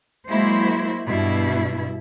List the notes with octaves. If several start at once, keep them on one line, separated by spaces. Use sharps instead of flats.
F#3 G#3 A#3 E4 F#4 C5
G2 B2 E4